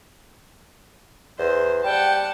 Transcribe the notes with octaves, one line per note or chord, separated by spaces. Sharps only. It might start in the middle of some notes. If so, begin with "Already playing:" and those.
E2 C5
G3 F#5 G5 A5